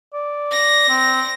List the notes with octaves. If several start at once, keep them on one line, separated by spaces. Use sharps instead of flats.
D5
A#6
C4